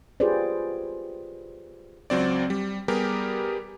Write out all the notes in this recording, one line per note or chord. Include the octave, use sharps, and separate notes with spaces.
F4 G4 G#4 B4 C5 D5
C#2 F#3 C4 D5
G3
G3 B3 G4 G#4 A#4